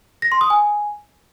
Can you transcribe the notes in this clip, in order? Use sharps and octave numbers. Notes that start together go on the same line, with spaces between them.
A#6
C6
D#6
G#5